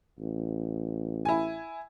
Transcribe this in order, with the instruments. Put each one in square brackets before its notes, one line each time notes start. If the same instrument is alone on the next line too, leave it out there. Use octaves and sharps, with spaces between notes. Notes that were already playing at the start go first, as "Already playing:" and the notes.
[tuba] A1
[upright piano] E4 G#5